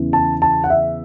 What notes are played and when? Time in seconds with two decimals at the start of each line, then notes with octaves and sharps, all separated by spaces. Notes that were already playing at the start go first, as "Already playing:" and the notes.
Already playing: E2 C#3 E3
0.13 A5
0.42 A5
0.64 F#5
0.70 E5